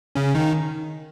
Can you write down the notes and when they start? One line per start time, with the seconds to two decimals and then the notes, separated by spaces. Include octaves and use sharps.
0.15 C#3 C#4
0.35 D#3 D#4